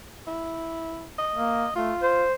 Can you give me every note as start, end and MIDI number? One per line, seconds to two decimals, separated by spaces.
0.27 1.09 64
1.19 1.73 75
1.35 1.66 58
1.75 1.92 57
1.75 2.24 65
2.02 2.34 72